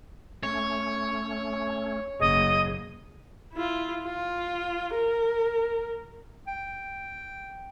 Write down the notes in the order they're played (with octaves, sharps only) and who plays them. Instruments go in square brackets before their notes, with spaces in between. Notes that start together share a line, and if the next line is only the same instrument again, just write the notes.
[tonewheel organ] A3 C#4 [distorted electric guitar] C#5
[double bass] F#1 [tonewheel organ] G#4 [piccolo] D#5
[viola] E4 F4
F4
A#4
[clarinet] G5